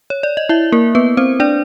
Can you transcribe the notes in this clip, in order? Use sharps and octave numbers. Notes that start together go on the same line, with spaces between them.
C#5
D5
D#5
E4 E5
A#3 A#4
B3 B4
C4 C5
D4 D5